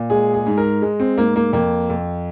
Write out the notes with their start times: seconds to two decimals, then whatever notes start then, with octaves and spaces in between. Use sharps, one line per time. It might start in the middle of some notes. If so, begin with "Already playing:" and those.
Already playing: A#2
0.10 G#3 G#4
0.34 G#4
0.46 G#2
0.57 A#4
0.82 G#3
1.00 C4
1.18 G#2 A#3
1.36 A#3
1.53 F2 A#3
1.90 F2